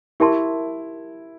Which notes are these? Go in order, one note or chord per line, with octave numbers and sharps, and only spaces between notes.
E4 G4 A#4 E5 A5 C6